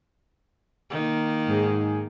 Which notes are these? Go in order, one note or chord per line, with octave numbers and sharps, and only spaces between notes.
D#3 A#3
G#2 G#4